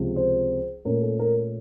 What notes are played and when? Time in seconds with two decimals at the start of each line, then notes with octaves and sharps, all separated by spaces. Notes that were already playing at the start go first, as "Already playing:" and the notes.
Already playing: C#2 C3 F3 C4
0.16 C5
0.85 A#2 A3 C#4 A#4
1.02 A4
1.19 A#4